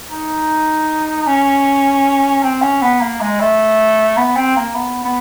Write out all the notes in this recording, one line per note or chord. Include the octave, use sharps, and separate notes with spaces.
D#4
C#4
C4
C#4
B3
A#3
G#3
A3
B3
C4
A#3
B3
B3